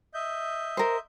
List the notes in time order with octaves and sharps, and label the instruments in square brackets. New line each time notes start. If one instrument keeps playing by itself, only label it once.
[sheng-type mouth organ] D#5 E5 G6
[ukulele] A#4 C5